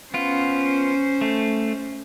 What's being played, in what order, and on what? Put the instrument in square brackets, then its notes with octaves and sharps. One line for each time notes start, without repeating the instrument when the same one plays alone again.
[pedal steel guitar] B3 F4 [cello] C#4 C5
[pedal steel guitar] A3